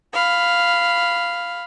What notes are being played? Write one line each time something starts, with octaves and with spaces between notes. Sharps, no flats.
F5 B5